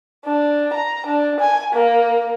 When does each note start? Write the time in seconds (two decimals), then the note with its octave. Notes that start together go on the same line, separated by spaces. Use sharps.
0.25 D4
0.73 A#5
1.06 D4
1.40 G#5
1.73 A#3